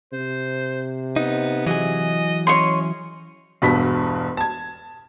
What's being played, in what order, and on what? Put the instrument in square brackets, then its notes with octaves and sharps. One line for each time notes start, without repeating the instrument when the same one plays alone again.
[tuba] C3 [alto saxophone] C5
[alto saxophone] B3 [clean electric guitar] D#4
[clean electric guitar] E3 F#3 G#4 [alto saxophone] D#5
[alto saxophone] C#4 [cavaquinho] C#5 D#5 C6
[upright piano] E1 G2 B2 F#4 B5 B6
A5 G#6